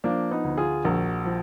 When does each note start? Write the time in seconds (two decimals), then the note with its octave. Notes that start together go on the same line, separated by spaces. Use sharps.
0.04 F3 A#3 D4
0.31 B3 D#4
0.44 D2
0.58 F4 G#4
0.85 A#1 F#4 A#4
1.25 F3